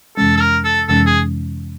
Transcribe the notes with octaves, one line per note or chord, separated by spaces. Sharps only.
F2 C3 E3 G#3 C#4 A4
A4
A#4
A4
F2 C3 E3 G#3 C#4 A4
G#4